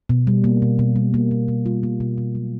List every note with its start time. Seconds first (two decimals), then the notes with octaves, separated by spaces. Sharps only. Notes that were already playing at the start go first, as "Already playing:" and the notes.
0.09 B2
0.27 G3
0.44 A#3
0.62 B2
0.79 B2
0.96 G3
1.14 A#3
1.31 B2
1.48 B2
1.66 G3 F4
1.83 A#3
2.00 B2
2.18 B2
2.35 F#3